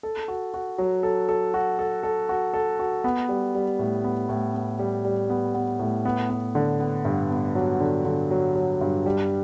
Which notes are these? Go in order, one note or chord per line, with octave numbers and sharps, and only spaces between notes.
A4
F#4
F#4
F#3
A4
A4
F#4
A4
A4
F#4
A4
F#4
B3
G3
G3
A2
B3
A2
B3
G3
G3
B3
B3
A2
B3
B3
D3
B3
G2
B3
F#3
D3
D3
F#3
F#3
G2
G3